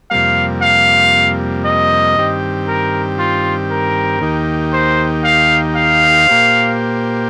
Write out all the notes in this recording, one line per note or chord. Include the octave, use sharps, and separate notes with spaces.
F2 C3 G3 A#3 F5
F5
D#5
G2 D#3 C4 G4
A#4
F4
A#4
D#2 D#3 A#3 D#4 G4
C5
F5
F5
A#2 A#3 G4 C5